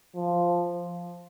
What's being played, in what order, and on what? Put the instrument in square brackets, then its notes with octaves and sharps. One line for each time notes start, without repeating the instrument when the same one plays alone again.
[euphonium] F3